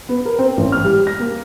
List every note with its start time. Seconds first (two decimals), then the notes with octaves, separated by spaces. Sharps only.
0.09 B3
0.25 A#4
0.39 C4
0.57 A1
0.72 F6
0.84 G3
1.07 A#6
1.20 A#3